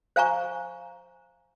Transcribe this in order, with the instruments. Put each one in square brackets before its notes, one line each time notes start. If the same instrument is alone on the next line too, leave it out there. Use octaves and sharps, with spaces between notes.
[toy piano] C5 F5 G#5 A#5 C#6